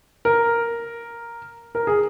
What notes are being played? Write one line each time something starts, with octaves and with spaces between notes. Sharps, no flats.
A#4
A#4
G#4